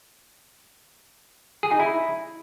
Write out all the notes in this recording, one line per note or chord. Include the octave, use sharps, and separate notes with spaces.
G#4
D#4
E4